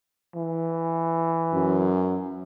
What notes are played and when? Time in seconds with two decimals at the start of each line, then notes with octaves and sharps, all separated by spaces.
0.35 E3
1.54 F#2